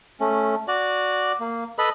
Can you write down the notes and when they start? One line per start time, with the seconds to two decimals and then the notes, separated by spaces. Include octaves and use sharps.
0.20 A3 C#4
0.68 F#4 D5
1.40 A#3
1.78 A4 B4 D#5 B5